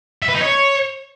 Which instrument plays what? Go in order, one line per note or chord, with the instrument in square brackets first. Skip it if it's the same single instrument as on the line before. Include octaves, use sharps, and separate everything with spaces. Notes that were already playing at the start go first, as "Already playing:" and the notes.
[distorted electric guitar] E5
B4
D#4
C#5